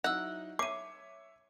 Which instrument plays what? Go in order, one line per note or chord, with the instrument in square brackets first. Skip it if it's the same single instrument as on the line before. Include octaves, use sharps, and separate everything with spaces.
[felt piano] F#3 D#4 E4 [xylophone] D#5 E5 E6 [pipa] F#5
[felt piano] C#5 E5 [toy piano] D6 [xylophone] C7 D#7